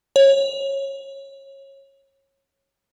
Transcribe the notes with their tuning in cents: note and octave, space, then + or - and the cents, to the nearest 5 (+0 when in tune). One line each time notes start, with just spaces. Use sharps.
C#5 -20